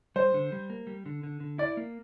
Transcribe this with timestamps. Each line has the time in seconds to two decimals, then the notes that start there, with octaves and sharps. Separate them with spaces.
0.16 G3 C5
0.34 D3
0.52 G3
0.70 A#3
0.87 G3
1.06 D3
1.23 D3
1.40 D3
1.58 E4 D5
1.77 A#3